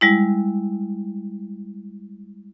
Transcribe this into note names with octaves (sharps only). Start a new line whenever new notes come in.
G3 G#3 E4